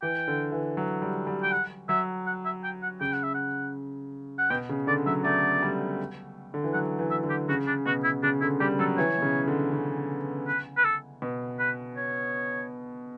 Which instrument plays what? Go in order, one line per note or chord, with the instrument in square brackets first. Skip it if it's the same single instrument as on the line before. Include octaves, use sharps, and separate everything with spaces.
[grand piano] E3 [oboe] G5
[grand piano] D3
E3
F#3
G3
G3
[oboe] G5
F#5
[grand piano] F#3 [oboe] E5
[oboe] F#5
E5
G5
F#5
[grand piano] C#3 [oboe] G5
[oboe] F#5
E5
F#5
F#5
[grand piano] B2 [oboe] G5
[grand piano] C#3
[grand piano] D3 [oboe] D5
[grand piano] F#3 [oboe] E5
[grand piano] A3 [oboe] D5
[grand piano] G3
D3
E3
[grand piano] F#3 [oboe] F#5
[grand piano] E3
[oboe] E5
[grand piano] D3
[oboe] G4
[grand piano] C#3 [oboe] F#4
[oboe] D4
[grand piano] B2 [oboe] F#4
[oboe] E4
[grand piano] C#3 [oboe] D4
[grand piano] D3 [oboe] E4
[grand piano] G3 [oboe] G4
[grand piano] F#3 [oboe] A4
[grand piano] E3 [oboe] C#5
[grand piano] B2
C#3
D3
C#3
[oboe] B4
B4
A4
[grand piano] B2
[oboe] B4
C#5